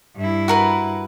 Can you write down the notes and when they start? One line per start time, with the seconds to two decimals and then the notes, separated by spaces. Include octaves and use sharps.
0.16 G2 E4
0.48 F#4 A#4 B4